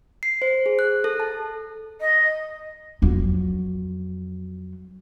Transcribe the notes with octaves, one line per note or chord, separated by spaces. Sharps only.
C7
C5
G#4
F#6
A4
A5
D#5
F2 F#3